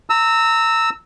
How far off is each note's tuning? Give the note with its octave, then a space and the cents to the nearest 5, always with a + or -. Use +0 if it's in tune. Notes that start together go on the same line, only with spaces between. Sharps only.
A#5 -30 E6 -10